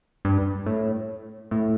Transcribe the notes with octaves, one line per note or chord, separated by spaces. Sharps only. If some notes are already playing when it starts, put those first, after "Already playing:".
G2
A2
A2